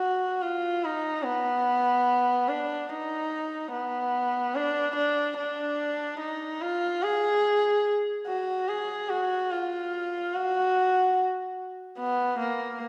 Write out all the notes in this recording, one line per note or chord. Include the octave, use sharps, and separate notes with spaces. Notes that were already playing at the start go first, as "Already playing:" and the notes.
Already playing: F#4
F4
D#4
B3
D4
D#4
B3
D4
D4
D4
D#4
F4
G#4
F#4
G#4
F#4
F4
F#4
B3
A#3